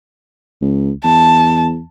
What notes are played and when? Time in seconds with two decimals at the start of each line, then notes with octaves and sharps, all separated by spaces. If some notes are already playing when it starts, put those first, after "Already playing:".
0.62 C#2
1.04 E2 A5